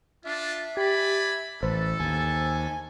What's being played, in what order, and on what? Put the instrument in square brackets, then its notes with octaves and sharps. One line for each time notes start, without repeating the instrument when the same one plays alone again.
[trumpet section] D4 F4 [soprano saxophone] E5
[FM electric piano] G4 [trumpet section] D5 G#5 B5
[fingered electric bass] A1 [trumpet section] A4 [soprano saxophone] B4 [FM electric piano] C5
[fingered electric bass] D#2 [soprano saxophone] G#5